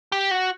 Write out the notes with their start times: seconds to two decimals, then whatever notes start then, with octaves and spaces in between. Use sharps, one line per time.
0.12 G4
0.31 F#4